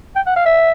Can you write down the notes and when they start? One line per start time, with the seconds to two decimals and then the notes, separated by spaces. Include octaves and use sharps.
0.16 G5
0.26 F#5
0.36 F5
0.46 E5